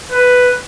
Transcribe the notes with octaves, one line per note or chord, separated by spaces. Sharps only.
B4